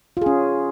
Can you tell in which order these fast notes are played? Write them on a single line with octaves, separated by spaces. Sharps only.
F4 G#4 C#4